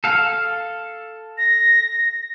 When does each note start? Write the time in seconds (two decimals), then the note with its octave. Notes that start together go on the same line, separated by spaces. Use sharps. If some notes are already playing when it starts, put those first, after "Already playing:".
0.04 A4 F5
1.38 A#6